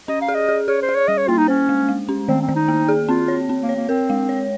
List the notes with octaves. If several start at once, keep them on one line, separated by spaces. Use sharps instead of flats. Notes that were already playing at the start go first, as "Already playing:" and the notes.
C#4 D#5
F5
G#4
D#5
G#4
G#4 C#5
C5
G#4
C#5
G3 D#5
C#5
A#3 F4
D#4
C#4 C5
G#3
G#3
C#4
D#3 C4
C4
D#3
D#4
A#3
G#4
C4 F4
C#5
C4
A#3
C#5
A#3
C4 A#4
G#3
C#5